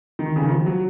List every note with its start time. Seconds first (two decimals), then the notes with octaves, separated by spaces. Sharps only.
0.19 D#3
0.36 C#3
0.43 D#3
0.50 F3
0.66 F#3